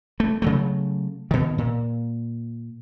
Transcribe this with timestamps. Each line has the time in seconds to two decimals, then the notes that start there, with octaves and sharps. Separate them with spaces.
0.20 A3
0.42 C#3 F#3 A3
1.31 B2 D#3
1.58 A#2